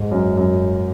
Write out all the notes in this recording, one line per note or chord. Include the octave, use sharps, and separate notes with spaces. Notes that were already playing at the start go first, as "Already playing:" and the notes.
Already playing: G#2
F#2
F#2